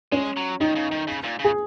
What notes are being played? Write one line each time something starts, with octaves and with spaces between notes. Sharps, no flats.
G#3 C#4
F#3
D#3 D#4
C#3
D#3
C#3
A#2
C#3
G#4